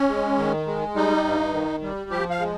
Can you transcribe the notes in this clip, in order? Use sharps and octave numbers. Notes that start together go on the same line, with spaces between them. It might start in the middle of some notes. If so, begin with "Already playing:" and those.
Already playing: C#4
G#3
D#3
G#3
G3 D#4
G2
D#3
G3
F3 G4
F5
G#3